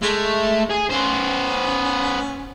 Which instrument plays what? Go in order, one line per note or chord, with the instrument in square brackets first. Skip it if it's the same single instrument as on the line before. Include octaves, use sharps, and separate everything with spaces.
[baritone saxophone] G#3 [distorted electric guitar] A3
[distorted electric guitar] G#4
[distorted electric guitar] B3 C5 [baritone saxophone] C#4